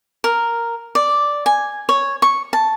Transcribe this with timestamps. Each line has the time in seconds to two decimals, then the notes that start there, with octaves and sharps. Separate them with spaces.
0.24 A#4
0.95 D5
1.46 G#5
1.89 C#5
2.22 C#6
2.53 A5